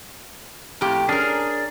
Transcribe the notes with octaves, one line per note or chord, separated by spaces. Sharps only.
F2 A2 G4
C#4 D4 G#4 A#4